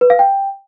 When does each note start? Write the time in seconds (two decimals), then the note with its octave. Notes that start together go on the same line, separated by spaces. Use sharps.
0.01 B4
0.10 F5
0.19 G5